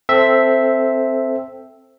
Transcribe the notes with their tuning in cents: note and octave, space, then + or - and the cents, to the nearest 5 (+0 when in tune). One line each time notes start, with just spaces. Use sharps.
C4 +0 A4 +0 E5 +0